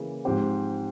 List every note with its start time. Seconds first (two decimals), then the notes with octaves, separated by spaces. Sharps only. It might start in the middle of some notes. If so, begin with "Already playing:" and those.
Already playing: C#3 E3 A#3
0.25 G#2 F3 C4 G4 C5